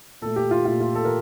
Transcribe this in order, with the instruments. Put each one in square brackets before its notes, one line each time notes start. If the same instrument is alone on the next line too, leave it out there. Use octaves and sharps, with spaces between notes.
[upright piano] A#2 A3 A4
G4
F4
A#2 A3 F4
F4
A4
A#4